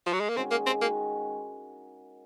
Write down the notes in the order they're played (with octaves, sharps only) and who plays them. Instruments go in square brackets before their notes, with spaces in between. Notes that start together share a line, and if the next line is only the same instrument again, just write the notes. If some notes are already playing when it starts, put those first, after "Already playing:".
[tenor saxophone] F3
F#3
G#3
A#3
[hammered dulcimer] D#3 G#3 C#4 F#4 [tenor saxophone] C4
[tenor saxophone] A#3
C4
[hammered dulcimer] D#3 G#3 C#4 F#4 [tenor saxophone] A#3